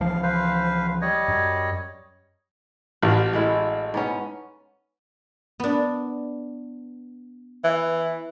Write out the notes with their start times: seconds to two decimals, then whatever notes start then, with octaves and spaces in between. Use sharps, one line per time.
0.01 C#2 E3 F3 F5
0.23 B4 C5 F5
1.01 G3 C#5 D#5
1.28 F#2
3.03 A1 F4 F#4
3.33 G#3 A3 E4
3.94 G#2 B3 C#4
5.60 B3 D4
7.64 E3